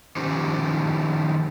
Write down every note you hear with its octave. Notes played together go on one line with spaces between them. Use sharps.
D#3 F3 C#4 D#4 G4 C5